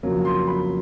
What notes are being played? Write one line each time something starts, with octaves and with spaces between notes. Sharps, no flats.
F2 C#3 F#3 A#3
C6
B5